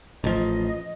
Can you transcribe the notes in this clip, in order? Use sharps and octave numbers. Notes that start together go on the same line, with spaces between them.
A1 F3 D#5